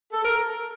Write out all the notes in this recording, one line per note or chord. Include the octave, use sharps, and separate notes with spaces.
A4
A#4